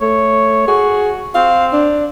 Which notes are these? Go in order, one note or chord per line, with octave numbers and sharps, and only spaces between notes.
A3 C#5
F#4 G#4
C4 F5
D4